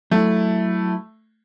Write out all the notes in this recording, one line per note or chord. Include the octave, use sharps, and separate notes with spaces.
F#3 A3 E4